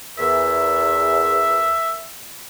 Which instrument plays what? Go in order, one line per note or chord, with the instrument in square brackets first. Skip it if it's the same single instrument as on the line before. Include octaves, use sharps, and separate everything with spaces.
[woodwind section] E2 [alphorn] A#4 [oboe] E5